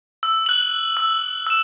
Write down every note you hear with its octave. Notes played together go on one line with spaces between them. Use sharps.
E6
F#6 F#7
E6
E6 E7